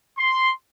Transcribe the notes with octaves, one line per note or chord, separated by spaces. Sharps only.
C6